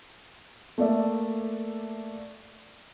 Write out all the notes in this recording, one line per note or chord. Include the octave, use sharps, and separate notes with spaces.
A3 A#3 D5 E5